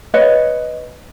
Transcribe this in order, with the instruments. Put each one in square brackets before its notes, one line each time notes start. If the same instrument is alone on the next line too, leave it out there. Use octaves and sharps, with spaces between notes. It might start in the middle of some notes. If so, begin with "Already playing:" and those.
[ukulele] B4 C#5 D#5